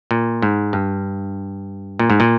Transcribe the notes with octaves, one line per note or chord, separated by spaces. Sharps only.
A#2
G#2
G2
A#2
G#2
A#2